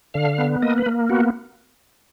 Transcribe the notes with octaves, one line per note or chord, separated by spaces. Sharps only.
D3 F5
B3
A#3 D#5
B4
A#3
B3 F#4